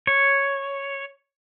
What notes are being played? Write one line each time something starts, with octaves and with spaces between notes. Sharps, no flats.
C#5